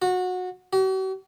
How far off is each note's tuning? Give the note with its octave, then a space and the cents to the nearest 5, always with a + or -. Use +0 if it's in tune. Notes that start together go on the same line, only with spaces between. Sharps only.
F#4 -20
F#4 +45